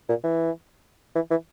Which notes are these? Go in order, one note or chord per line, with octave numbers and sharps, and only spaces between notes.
A#2
E3
E3
E3